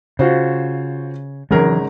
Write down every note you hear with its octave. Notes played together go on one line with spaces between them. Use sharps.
C#3 F4 F#4 C5
G#1 C#3 E3 F#3 G#3 A#4